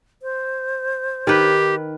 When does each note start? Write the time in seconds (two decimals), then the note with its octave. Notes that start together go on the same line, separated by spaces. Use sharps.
0.22 C5
1.27 D#3 G4 B4